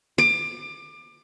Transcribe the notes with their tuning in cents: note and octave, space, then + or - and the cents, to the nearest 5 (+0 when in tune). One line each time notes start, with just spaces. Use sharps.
D6 +30